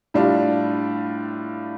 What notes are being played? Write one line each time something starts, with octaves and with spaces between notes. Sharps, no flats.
A2 G3 D4 F4